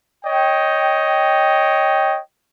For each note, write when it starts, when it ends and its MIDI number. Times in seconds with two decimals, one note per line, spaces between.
0.24 2.19 73
0.24 2.19 75
0.24 2.19 79